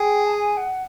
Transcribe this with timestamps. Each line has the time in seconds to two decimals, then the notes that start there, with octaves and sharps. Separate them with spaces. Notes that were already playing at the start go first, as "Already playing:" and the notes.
Already playing: G#4 G5
0.24 A5
0.32 G#5
0.56 F#5